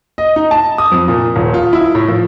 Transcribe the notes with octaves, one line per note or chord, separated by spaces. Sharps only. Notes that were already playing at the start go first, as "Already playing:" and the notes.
D#5
D#4
A5
D#6
F2
A#2
D#1
F4
E4
A2
F3